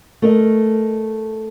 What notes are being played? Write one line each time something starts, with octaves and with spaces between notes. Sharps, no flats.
A3 A#4 D#5